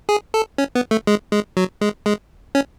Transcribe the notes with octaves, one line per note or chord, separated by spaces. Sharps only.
G#4
A4
C#4
B3
A3
G#3
G#3
F#3
G#3
G#3
C#4